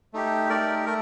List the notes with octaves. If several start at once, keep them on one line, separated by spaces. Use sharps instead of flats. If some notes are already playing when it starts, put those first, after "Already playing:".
A3 D#4 G4
A3 D#4 G4 A#4 D5
A3 A#4